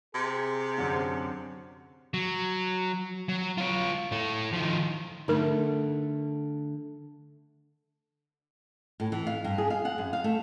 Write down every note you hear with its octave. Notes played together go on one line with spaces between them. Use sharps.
C3 G#4
F#2 D3 C4
F#3
F#3
F4 C#5
A2 A3
D#3 F3
D3 A3 D#4 A#4
A2
E3
F5
G2
G#4
F5
F#5
F#2
F5
A3